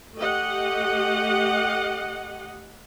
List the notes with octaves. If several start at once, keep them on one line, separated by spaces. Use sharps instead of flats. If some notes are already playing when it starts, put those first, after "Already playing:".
A3 G4 D#5 F#5